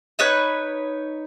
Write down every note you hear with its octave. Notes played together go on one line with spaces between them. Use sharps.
D#4 B4 C#5 F#6